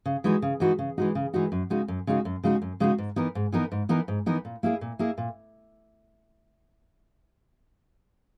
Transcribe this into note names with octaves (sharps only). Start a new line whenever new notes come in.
C#3
E3 G#3 D#4 F#4
C#3
E3 G#3 D#4 F#4
C#3
E3 G#3 D#4 F#4
C#3
E3 G#3 D#4 F#4
F#2
C#3 G#3 D#4 F#4
F#2
C#3 G#3 D#4 F#4
F#2
C#3 G#3 D#4 F#4
F#2
C#3 G#3 D#4 F#4
G#2
E3 B3 D#4 A#4
G#2
E3 B3 D#4 A#4
G#2
E3 B3 D#4 A#4
G#2
E3 B3 D#4 A#4
A#2
A#3 E4 G#4
A#2
A#3 E4 G#4
A#2